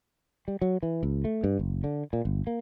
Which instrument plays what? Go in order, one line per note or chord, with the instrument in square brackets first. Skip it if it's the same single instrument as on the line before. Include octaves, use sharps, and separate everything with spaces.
[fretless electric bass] G3
F#3
E3
C#2
A3
G2
F#1
D3
A#2
G1
A#3